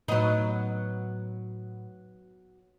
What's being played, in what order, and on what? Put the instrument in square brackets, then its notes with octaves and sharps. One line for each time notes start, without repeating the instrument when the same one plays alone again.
[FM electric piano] A2 [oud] F#3 B3 D#4